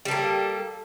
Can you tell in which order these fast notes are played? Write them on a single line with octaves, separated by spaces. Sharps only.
G3 A4 A#3